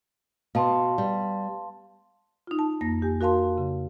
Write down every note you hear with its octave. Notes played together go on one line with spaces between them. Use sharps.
B2 F5 A5 C6
G3
D#4 F4
A5
F2 A#3 A#6
G4 G#5
F#4 A#4 F5 A5 C6
C#3